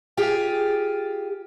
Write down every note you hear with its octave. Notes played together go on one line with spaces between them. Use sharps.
F4 G4 G#4